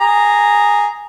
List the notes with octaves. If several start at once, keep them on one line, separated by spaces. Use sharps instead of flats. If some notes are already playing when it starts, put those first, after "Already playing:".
G#4 A#5